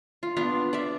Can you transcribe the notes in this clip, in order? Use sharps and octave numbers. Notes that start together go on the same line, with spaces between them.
F4
B3 D4 F4
D5 E5